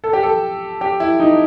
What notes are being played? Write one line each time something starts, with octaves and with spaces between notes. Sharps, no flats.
A4
G4
A4
G4
E4
D#4